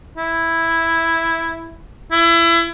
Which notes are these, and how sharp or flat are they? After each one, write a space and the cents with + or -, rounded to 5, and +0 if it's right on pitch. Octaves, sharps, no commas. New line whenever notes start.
E4 +0
E4 +30